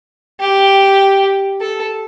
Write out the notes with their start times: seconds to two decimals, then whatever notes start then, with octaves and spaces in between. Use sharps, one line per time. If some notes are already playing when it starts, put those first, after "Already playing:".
0.40 G4
1.61 A4